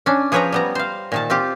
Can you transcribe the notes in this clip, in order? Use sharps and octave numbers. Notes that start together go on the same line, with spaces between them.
C#4 D4
F3 G#4 B4 C#5 G5 A#5
G3 B3 A#5
C5 F5
A#2 D#3 A5
C4 F4 G4